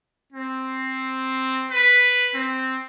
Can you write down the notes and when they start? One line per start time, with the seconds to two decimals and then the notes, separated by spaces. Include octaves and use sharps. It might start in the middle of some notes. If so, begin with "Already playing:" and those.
0.33 C4
1.71 B4
2.35 C4